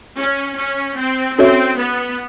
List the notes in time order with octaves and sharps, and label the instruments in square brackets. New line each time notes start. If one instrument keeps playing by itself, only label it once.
[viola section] C#4
C#4
C4
[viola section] C4 [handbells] C#4 F#4 A4 C#5 E5
[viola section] B3